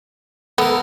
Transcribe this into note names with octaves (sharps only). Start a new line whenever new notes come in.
B3 A4 A#4